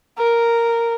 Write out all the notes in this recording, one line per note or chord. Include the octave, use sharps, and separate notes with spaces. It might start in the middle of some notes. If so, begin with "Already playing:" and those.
A#4